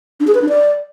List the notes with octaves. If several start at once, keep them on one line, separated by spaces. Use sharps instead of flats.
D4
G#4
B4
D4
D5